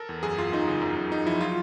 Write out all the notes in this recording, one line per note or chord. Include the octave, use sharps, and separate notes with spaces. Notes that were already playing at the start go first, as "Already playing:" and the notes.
Already playing: A4 A#4
E2
F#2 G#4
F#2 F4
F#2 D#4
C#3
F#2
F#2
F#2 D#4
F3 E4
F#3 F4